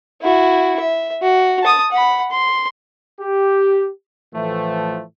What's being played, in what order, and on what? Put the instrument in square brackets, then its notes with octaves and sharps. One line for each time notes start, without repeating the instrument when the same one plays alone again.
[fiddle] E4 F#4
E5
F#4
A5 D#6
F#5 B5
C6
[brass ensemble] G4
A2 E3 F3 A3